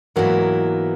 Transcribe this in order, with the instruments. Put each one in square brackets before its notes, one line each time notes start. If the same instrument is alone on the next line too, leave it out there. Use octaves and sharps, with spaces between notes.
[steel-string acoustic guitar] G#2 E3 B3 E4 A#4 [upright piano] F#3 A#3